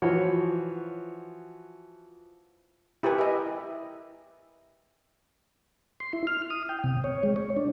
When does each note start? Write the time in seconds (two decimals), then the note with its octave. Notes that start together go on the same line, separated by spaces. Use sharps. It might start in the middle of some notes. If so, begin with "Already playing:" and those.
0.02 E3 F3 F#4 C#5
3.03 E4 G4 A#4 B4 G#5
3.18 D#5 E5
6.00 C6
6.13 E4
6.27 F6
6.50 D#6
6.69 G5
6.84 C3
7.04 C#5
7.23 G#3
7.36 C#5
7.57 D4